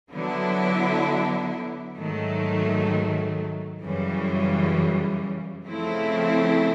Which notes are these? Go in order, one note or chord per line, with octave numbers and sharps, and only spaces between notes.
D3 F#3 B3 E4
G#2 D#3 F#3 A3
F#2 C#3 E3 G3
C#3 F3 A3 C4 E4